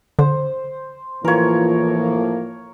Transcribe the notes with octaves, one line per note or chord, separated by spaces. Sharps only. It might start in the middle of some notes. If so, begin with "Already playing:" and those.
D3 C5
A2 E3 F3 A#3 F4 A#4 C#5